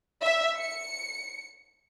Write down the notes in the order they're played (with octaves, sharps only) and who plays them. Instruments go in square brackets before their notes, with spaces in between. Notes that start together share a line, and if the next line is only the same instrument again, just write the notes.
[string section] E5
C#7